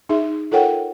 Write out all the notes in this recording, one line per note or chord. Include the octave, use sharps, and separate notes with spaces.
D#4 G#4 E5
F4 A4 A#4 C#5 F#5 G5